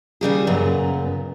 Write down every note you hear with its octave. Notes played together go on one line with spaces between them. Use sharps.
D#2 C#3 G3 G#4
F#2 A#2 C#3 B3